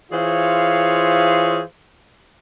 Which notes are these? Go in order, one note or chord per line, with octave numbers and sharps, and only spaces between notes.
E3 F4 G#4 C5 C#5 F5